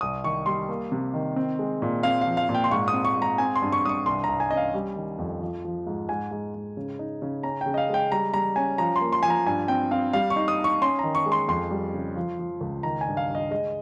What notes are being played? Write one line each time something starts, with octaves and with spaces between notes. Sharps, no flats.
C2 D#6
D#3 C#6
G3 C6
A#3
C3
D#3
C4
G#3
A#2
C4 F5
F5
F3
F5
A#2
G5
C6
G#2 C#6
D#6
C4
C#6
G#2
A#5
C4 G#5
C6
G2
C#6
G2 C#6 D#6
C2 C6
C2 A#5
G#5
C#4 D#5
F5
G3
D#3
F2
F3
F3
G#2
G#2 G#5
G#2
G#2
C#3
D#4
C#3
C#4 A#5
C#3 G5
D#5
F5
G#3 G5
G3 A#5
G3 A#5
C#4 G#5
F3 A#5
C6
A#3
C6
F3 G#5
A#5
G2 G#5
C4 G5
C4 F5
G3 F5
C#6
D#4
D#6
D#4
C#6
C#4 C6
D#3 A#5
C#6
G#3
C6
F2 C6
G3
C#3
F3
F3
C#2
D#3 A#5
G#5
G2
F5
G2
D#5
G#3 D#5